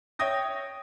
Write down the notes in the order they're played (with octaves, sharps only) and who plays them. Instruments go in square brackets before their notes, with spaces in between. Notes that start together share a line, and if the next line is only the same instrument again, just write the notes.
[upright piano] C#5 E5 G5 D#6 A#6